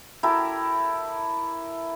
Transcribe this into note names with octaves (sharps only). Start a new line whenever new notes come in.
E4 G4 A4 A#4